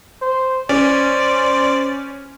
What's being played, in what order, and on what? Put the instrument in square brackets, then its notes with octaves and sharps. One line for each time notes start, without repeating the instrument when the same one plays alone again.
[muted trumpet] C5
[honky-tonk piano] C#4 [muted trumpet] C5 [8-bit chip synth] D5